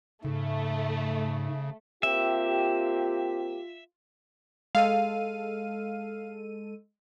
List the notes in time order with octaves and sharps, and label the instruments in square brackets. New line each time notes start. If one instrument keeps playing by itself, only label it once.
[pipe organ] G#2 [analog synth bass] C#3 [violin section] A3
[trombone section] A#3 C4 G4 [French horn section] F4 [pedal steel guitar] E5
[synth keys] G#3 A4 D#7 [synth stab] F5